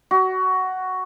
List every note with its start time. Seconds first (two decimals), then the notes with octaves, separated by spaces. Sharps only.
0.11 F#4